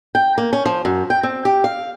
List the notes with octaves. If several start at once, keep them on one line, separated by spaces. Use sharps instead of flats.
G5
A#3
C#4
F3
F#2
G5
C4
G4
F5